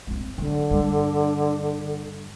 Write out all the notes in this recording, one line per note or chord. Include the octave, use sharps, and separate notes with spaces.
B3 C4
D3 F#3
G2 G3